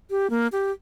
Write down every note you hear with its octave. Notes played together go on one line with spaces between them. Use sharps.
G4
A#3
G4